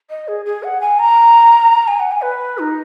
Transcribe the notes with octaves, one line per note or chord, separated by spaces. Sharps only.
D#5
G#4
G#4
F#5
G#5
A#5
G#5
F#5
G#5
B4
D#4